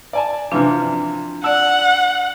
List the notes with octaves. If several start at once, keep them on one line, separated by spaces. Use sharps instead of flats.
D5 G#5 A5
C3 E3 F3 D4 F4
D5 F#5 A5 E6